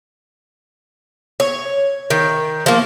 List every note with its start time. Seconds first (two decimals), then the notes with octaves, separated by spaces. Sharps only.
1.40 C#5
2.10 D#3
2.66 F3 A#3